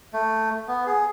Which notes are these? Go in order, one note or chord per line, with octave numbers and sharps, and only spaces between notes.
A3
B3
G#4